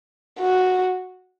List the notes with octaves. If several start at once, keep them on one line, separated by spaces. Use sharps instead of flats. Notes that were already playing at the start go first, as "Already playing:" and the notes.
F#4